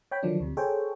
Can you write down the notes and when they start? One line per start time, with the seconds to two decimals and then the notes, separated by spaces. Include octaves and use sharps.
0.11 C#5 G5 B5
0.23 D3 D#3 F3 F#3 D4
0.40 D2 C3
0.57 G#4 A4 C5 C#5 G5